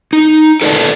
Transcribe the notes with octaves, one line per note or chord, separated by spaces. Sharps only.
D#4
A4 B4 D5 D#5 G5 A5